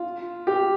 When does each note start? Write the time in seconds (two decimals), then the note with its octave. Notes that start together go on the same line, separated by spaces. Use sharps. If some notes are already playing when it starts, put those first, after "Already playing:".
Already playing: F4
0.47 G4